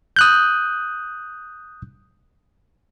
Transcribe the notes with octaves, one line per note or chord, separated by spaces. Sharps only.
D#6 F#6 G6